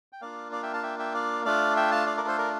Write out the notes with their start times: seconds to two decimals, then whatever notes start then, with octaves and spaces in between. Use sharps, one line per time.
0.13 G5
0.21 A#3 D4 F4 D5 F5
0.52 D5 F5
0.63 E5 G5
0.74 F5 A5
0.83 E5 G5
0.99 E5 G5
1.14 D5 F5
1.45 A3 D4 F4 D5 F5
1.76 E5 G5
1.92 F5 A5
2.07 D5 F5
2.17 A#4 D5
2.28 A4 C5
2.38 A#4 D5